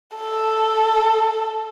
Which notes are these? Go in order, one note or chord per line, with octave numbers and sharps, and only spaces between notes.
A4